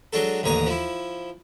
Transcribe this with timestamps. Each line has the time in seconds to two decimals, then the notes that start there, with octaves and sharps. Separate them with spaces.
0.13 F#3 G#3 D4 F#4 A4
0.43 A1 D#2 D3 C#5 A#5 D#6
0.67 F3 E4